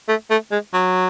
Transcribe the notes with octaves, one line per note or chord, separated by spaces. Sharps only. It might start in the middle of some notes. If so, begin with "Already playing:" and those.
A3
A3
G#3
F#3